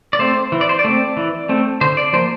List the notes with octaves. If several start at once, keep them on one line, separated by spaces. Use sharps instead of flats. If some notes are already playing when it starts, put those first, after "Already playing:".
D5
A3 C4 C5
E3
D5
C5
D5
A3 C4
E3
A3 C4
D3 C5
D5
F3 A#3 C5